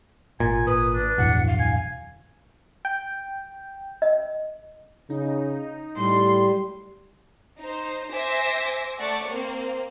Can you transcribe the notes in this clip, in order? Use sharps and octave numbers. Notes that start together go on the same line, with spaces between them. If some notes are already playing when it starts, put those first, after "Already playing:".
G#1 A#2 G#5
G#1 B4 D#6
D4
D1 F2 B2 E3 F#5
F5
G#5
G5
D#5
C#3 D#4
A2 G3 C6
D#4 C5
C5 E5 G#5 D6 A#6
A3 D5 F#5 C#6
A#3 C4 C5